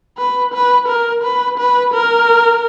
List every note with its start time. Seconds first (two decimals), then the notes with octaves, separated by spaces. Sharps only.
0.17 B4
0.53 B4
0.88 A#4
1.23 B4
1.58 B4
1.94 A#4